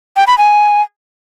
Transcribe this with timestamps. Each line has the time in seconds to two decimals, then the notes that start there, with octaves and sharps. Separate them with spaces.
0.16 G5
0.27 B5
0.38 G#5